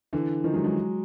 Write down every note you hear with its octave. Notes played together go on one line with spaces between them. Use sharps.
D3 E3
D#3 F3
F#3 G#3
F#3 G#3